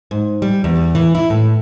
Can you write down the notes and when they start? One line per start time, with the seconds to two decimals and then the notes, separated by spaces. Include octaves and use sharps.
0.11 G#2
0.42 G3
0.64 E2
0.95 E3
1.15 E4
1.30 A2